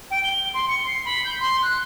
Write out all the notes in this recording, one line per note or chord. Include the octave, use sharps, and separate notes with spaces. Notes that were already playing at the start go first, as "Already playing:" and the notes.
G5
G7
C6
C#7
C7
B5
G6
C6
F#6